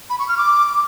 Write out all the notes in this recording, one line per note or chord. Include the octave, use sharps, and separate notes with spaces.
B5
C#6
F6
D6